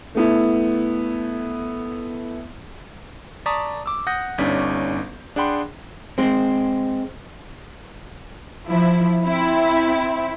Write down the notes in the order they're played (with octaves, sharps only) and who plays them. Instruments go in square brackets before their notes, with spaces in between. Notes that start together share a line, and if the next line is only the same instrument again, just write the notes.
[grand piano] A3 B3 E4
[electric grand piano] D5 A5 A#5 C#6 D#6 B6
D6 E6
F#5 D#6 G6 A#6
G1 G2 C#4 D#4 D5 B6
D4 G#4 F#5 G5 B5 C6
[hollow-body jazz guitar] G#3 C4
[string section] F3 E4
C4 E4